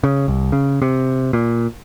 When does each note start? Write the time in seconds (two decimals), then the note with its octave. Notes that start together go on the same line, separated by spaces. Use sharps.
0.04 C#3
0.28 C2
0.52 C#3
0.82 C3
1.33 A#2